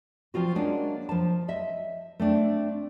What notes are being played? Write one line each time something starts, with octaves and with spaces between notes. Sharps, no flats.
F3 C4 F4 F#4
G#3 A#3 C#4 D4 F#5
F3 A5
D#5 E5
A3 C4 D4